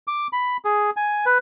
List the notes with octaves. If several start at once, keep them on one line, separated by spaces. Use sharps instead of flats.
D6
B5
G#4
G#5
B4